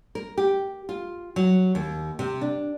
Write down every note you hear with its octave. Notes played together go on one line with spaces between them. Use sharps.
A#4
G4
F4
F#3
D#2
C3
D4